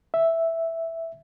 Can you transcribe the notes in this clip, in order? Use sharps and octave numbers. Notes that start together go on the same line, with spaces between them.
E5